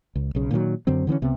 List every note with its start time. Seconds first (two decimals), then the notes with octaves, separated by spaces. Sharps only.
0.16 C#2
0.35 B1 C#3
0.51 A#2 D#3 E3 F#3
0.87 F#2 D3 F#3 C4
1.07 D3 E3 B3 C#4
1.22 C#2 C3 B3